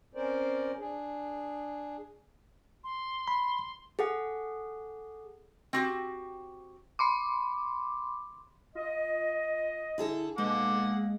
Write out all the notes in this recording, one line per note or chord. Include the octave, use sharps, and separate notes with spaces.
C4 C#4 A#4 C5 D5
D4 G#4
C6
B5
G#4 A4 F#5
C4 F#4 G4
B5 C6 D6
F4 D#5
D3 E4 G#4 A4
B2 G#3 A#3 G#4 F#5 D6